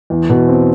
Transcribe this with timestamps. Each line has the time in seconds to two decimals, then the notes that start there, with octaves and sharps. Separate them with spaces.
0.10 E2
0.30 B2
0.48 C4